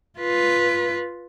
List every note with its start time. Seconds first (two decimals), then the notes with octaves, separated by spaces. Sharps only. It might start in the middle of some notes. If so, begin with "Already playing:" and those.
0.19 F4 B4